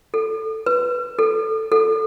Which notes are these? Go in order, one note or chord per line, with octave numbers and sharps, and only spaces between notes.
A4
B4
A4
A4